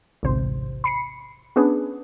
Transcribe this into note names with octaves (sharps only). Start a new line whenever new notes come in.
A1 D2 G#2 C3 C5
B5 C7 C#7
B3 C#4 D4 G#4 B4